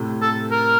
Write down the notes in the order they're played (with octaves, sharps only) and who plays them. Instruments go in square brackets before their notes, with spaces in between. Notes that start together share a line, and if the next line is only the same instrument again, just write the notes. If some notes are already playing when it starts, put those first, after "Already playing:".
Already playing: [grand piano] A2 C3
[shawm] A4
A#4